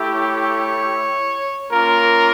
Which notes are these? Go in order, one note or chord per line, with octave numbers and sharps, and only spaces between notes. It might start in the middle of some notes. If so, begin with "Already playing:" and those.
Already playing: A3 E4 G4
C#5
A#3 C#4 F4 A#4